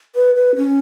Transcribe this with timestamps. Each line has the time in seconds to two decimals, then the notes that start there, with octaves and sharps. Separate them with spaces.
0.16 B4
0.35 B4
0.56 C#4